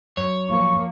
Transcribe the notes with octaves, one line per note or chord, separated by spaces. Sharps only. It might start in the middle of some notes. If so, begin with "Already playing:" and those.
F#2 C#5
F3 A#3 C#6